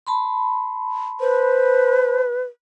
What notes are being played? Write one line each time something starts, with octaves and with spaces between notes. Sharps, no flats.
A5 B5 C6
B4 C5